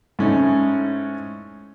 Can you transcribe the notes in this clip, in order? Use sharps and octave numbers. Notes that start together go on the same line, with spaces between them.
G#2 A3 C#4 D#4 E4